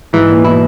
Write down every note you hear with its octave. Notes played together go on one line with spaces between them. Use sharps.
G#2 E3
A#2
B2 E4